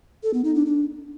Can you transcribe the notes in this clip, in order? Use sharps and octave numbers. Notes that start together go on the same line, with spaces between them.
A4
B3
D#4
D4
D4